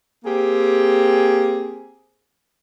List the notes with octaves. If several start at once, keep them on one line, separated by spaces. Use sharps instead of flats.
A#3 C4 G4 G#4